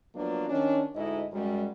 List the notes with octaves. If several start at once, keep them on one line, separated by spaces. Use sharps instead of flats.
F3 F#3 A#3 B3 D4 F4
D#3 C#4 D4
D2 G#2 E4 D#5
F#2 G3 G#3